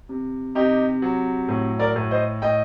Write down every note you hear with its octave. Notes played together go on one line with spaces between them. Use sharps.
C3
C3 D#4 G4
F#3
A2
A#4 D5
A2
C5 D#5
A2 D#5 G5